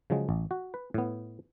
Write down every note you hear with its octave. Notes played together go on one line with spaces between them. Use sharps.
C#3 F3 F#3 G#3
A1
F#4
B4
A2 B3